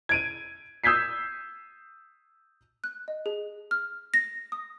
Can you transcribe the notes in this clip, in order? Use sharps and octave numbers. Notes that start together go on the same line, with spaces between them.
G#6 D7 D#7
D#6 E6 G6 G#6 B6 C7
F#6
D#5
G#4
F6
A#6
D#6